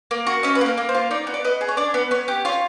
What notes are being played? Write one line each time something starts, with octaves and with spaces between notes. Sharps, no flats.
A#3
F#4
C#4 D#5
B4
A#3
A#4
A#3
C5
F4
D#4 D5
B3
D5
B3 D#5
G#4
C#5
D4 D5
B3
B3 C#5
G4
F4 C#5